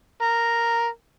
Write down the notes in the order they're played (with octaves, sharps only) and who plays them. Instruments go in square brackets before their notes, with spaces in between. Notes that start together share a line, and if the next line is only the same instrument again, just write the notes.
[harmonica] A#4